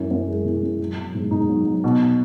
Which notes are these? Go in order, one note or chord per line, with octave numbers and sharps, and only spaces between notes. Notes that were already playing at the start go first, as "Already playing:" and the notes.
Already playing: F#2 E3
F#2
G#3
E3
F#2
F#3
F#3
G#2
G#2 D#4
F#3
F#3
B2